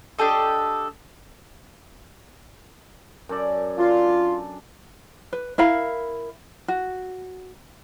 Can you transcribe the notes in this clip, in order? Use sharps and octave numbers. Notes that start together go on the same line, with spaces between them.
D4 G4 A4 D#5
F#2 A4 D5
D4 F4
B4
E4 A#4 F5 B5
F#4